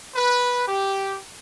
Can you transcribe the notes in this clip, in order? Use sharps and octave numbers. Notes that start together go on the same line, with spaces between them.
B4
G4